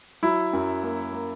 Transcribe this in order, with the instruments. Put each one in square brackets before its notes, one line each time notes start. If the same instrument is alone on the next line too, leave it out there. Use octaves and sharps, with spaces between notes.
[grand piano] F#3 E4
F#2
A#3
A#3